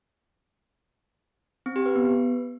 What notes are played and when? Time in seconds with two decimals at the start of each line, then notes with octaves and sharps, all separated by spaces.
1.66 C4
1.76 G4
1.86 B4
1.96 B3
2.05 B4